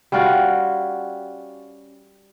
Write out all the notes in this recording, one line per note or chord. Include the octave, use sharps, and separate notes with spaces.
G3 C#4 F4 F#4